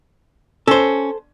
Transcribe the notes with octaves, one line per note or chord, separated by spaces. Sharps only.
C#4 A4 C5